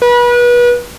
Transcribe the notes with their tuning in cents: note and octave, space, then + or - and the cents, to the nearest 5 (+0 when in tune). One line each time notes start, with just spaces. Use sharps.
B4 -30